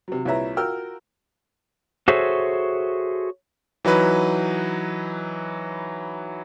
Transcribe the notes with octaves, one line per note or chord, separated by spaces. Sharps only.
C3 F#3
C2 A#2 B4 C#5 E5 A#5
F4 F#4 A#4 G5 E6 F6
F#4 G#4 A4 C5 C#5 E5
E3 F#3 D#4 B4